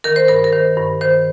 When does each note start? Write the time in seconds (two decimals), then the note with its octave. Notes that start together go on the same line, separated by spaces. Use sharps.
0.04 D#3 A#4
0.16 C5
0.28 G2 A#4
0.44 A#4
0.53 D#3 C5
0.77 G2
1.01 D#3 C5